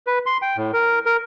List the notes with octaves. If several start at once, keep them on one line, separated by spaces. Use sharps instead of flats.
B4
C6
G5
A2
A#4
A#4